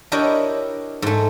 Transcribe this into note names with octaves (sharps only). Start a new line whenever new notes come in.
D4 E4 G4 A#4 C#5 D#5
G#2 A3